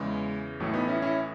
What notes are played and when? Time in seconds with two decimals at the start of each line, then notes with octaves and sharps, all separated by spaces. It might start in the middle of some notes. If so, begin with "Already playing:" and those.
Already playing: E2 C#3 E3 G#3
0.60 A1 A2 E3 F#3 A3
0.73 B3 D#4
0.88 C#4 E4
1.02 C#4 E4